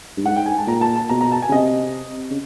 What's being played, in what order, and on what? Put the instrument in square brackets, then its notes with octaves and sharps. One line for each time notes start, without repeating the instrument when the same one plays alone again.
[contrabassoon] G2
[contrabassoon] G#2 [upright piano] F#5
[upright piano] G5
G#5
A5
[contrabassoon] A#2 [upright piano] A#5
[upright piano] A5
A5
[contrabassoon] B2 [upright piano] A#5
[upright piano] A#5
A5
G#5
[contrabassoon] C#3
[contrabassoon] C3 [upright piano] D#5
[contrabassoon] C#3